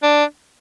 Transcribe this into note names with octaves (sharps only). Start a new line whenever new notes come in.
D4